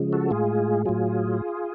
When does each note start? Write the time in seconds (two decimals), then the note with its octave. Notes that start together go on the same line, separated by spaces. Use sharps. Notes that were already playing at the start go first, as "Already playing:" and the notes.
Already playing: C#3 F3 G#3
0.13 F#4 A4
0.30 A2 G#3 F4 G#4
0.85 A2 F#3 F4 G#4